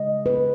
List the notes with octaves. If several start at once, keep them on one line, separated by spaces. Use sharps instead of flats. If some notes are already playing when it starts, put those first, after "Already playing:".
Already playing: C#3 G#3 D#5
B4